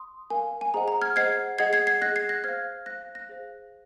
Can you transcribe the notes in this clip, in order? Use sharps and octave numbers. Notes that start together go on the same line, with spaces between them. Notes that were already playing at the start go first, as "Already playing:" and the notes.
Already playing: C6 D#6
A#4 F5 G#5
G#5
G#4 C5 D#5 F#5 A#5
A#5
F6 G#6
G#4 C5 D#5 F#5 G#6 C7
G#4 D#5 F#5 G#6 C7
G#6 C7
G#6 C7
G#4 D#5 F#5 F#6 A#6
G#6 C7
F#6 A#6
C5 F5 F6 G#6
C5 F5 F#6 A#6
F#6 A#6
G#4 C5 F5